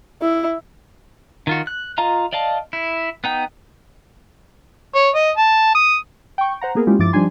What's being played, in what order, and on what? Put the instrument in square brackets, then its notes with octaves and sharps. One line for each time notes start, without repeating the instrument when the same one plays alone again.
[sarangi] E4
[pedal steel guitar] D#3 F4 F#4
F#6
F4 D#5 F5 A#5
D5 D#5 F5 A5
E4
B3 D#4 G5
[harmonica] C#5
D#5
A5
D#6
[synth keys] G5 C#6
C5 F#5 A#5
A#3 B3 G#4 A#4
G#3 A#3 C#4 E4 F4 G4
G2 F3 E4 D6 A6
F3 G3 D4 D#4 G#5 C6